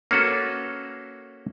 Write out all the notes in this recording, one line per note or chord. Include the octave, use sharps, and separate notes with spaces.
A#3 C#4 F#4 A4 B4